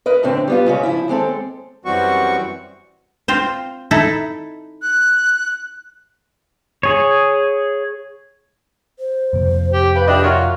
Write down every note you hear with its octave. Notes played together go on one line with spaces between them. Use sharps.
A#4 B4 D#5
F2 A2 D3 C4
G3 B3 F4
G#2 C#3 C#4
F3 E4
D#2 G#3 C4 A4
F#2 E3 G3 C4 F#4 C#6
C4 F4 C5
D#4 E4 A4
F#6
G#4 C#5
C5
F2 C3 A#3
G4
B4 F5 G5
D4 G4 D#5 E5
F4 F#4 A#4 C#5